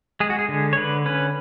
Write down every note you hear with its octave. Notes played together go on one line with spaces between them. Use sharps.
G#3 G#4
F#4
G#4
D3
C#5
D3 B4
C#4 B4